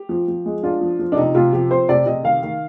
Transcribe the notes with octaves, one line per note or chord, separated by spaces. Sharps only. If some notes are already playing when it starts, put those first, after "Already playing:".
Already playing: G4
F3
F3
G#3
D4 F4
F3
F3
D4
C3 D#4
C3 F4
F3 G4
C4 C5
C3 D5
C3 D#5
D#3 F5
D#3